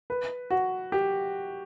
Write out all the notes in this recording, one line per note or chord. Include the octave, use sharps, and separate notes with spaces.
B4
F#4
G4